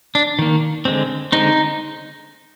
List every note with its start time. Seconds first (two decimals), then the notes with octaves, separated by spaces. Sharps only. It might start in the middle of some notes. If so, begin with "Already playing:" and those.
0.15 D4
0.39 D#3 A#3
0.85 D3 G#3 C4
1.32 D3 G#3 C4 D#4